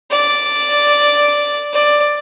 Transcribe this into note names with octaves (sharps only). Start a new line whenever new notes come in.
D5
D5